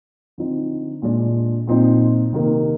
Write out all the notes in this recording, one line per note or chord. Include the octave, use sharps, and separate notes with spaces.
D3 F3 C4 D#4
A#2 G#3 D4
A#2 F3 C4 D#4
C3 D#3 A#3